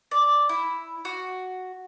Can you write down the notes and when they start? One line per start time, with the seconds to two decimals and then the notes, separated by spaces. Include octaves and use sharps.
0.11 D5
0.49 E4
1.05 F#4